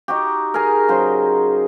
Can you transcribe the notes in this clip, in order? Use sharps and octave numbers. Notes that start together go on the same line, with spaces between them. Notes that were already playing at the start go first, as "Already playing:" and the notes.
D#4 F#4 G4
G#4 A#4
C#3 F#3 C5